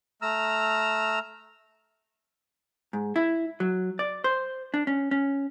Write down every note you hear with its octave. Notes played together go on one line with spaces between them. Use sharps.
A3 A#5 E6 F6
G#2
E4
F#3
D5
C5
D4
C#4
C#4